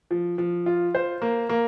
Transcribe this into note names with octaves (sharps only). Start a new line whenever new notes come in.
F3
F3
F4
C5
A#3
A#3